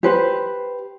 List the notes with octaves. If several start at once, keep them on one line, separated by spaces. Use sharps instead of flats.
G4 B4 C5